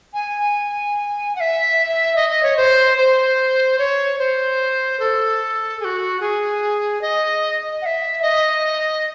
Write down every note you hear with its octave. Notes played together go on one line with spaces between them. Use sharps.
G#5
F#5
E5
D#5
D#5
C#5
C5
C5
C#5
C5
A4
G#4
F#4
G#4
D#5
F#5
E5
D#5